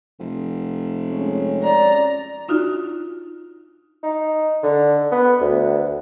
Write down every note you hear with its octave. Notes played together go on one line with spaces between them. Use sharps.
F1
G#3 C#4
D5 A#5
D4 D#4 F4 F#4
D#4
D3
B3
D2